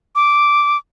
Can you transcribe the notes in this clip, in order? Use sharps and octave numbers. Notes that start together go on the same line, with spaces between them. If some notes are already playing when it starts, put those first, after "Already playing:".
D6